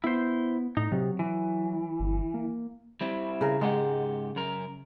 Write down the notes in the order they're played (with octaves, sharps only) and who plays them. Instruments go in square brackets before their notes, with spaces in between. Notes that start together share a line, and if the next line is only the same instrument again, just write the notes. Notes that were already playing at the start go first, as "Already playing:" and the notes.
[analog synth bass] B3 [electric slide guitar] E4 C5
[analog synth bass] A2 [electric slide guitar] D#4
[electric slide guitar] C3 [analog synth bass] F#3
[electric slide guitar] E3
[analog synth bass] G1
A#3
[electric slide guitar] G3 C4 E4
[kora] C#3 A#4
[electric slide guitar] G#2 G4 F#5 [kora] G#3
[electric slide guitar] F#2 A#4